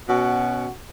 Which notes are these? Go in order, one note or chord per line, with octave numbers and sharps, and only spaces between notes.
B2 C#4 F#4